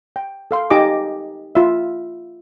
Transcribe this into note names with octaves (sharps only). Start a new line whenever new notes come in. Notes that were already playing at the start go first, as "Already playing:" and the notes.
G5
A4 F5 C6
D#4 G4 D#5 G#5 D6
F4 E5